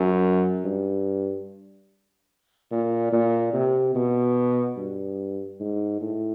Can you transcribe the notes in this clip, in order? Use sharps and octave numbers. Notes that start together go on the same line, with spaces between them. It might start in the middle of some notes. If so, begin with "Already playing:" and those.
Already playing: F#2
G2
A#2
A#2
C3
B2
G2
G#2
A2